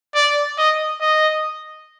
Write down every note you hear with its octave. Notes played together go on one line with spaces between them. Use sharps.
D5
D#5
D#5